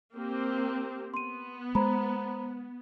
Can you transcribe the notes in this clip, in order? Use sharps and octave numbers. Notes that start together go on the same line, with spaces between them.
A#3 C4 G4
B3 C6 D#7
G#3 C5 A#5 B5